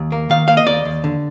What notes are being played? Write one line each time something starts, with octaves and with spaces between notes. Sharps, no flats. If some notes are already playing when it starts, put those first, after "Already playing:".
Already playing: D#2
A#3
D#3 F5
A#3 F5
D#5
D#2 D5
D#2
D3